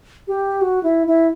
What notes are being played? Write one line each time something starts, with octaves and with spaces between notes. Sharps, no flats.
G4
F#4
E4
E4